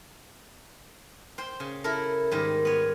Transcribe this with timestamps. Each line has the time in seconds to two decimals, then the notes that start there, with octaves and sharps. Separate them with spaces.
1.38 C5 G5
1.60 C#3
1.84 E4 A4 A#4
2.31 G#2 D#3 G3
2.65 B3 C#5